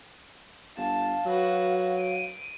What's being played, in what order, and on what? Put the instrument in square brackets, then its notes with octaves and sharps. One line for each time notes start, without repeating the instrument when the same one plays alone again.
[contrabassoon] G1 [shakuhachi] F5 [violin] A5
[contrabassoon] F#3 [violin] F#4 B4
[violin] D7 D#7